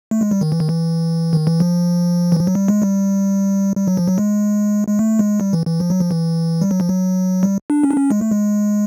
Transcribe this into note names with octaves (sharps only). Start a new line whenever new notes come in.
A3
G#3
G3
D#3
E3
D#3
E3
D#3
E3
F3
E3
F3
F#3
G3
G#3
G3
G3
F#3
F3
F#3
G#3
G#3
A3
G#3
G3
E3
E3
F3
F#3
F3
E3
G3
F#3
F3
F#3
G3
D4
C#4
D4
C#4
G#3
A3
G#3